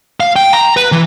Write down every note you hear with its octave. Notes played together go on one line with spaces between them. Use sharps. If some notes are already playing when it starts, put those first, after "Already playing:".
F5
G5
A#5
B4
E3